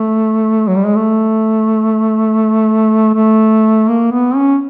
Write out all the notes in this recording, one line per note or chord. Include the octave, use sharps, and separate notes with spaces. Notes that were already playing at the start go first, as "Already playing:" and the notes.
Already playing: A3
F#3
G3
G#3
A3
A3
A#3
B3
C#4